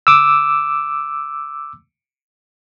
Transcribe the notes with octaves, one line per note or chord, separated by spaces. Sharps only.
D6 E6